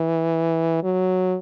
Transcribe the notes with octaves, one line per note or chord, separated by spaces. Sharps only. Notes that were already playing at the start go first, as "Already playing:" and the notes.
Already playing: E3
F#3